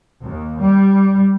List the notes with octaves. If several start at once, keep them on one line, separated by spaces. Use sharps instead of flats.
D#2
G3